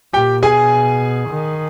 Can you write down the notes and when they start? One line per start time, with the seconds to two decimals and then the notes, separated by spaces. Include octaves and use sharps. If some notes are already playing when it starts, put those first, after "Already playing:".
0.13 A#2 G4 G5
0.43 B2 G#4 G#5
1.30 D#3